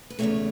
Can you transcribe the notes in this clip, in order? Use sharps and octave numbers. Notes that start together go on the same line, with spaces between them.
B4
E2 C#3 E3 A3 C#5